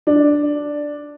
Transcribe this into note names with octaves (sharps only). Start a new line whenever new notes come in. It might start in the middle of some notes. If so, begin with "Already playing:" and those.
D4